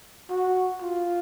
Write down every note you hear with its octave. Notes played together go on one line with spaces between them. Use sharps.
F#4
F4